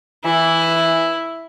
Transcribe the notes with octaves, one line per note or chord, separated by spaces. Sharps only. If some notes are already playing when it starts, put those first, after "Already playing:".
E3 E4